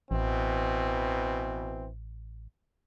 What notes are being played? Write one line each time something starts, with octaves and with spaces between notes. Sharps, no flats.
A1 B2 E3 C4